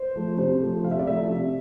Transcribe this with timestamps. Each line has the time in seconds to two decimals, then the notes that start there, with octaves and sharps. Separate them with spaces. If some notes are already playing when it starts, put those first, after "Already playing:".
Already playing: C5
0.16 F3 A3
0.37 C3 C5
0.61 F3 A3
0.84 C3 F5
0.91 E5
0.99 D5
1.07 F3 A3 E5
1.30 C3